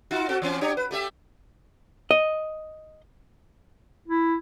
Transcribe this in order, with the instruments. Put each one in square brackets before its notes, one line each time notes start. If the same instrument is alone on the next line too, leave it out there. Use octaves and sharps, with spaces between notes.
[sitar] D#4 F4 F#4
C4 F#4 A4
E3 C4 C#4
D4 G4 C#5
B4
A3 G4 E5
[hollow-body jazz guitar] D#5
[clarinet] E4